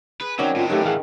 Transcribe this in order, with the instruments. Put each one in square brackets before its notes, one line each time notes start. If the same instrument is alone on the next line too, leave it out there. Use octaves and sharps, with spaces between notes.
[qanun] G#4 [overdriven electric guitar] B4
[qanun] D#3 C4 [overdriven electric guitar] F#3 [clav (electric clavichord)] C#4 F#4 D5
[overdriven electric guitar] A2 D4 [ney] F4
[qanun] D#3 C#4 [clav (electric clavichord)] F#3 A3 [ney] G4
[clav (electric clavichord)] E3 F5 F#5 [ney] G#4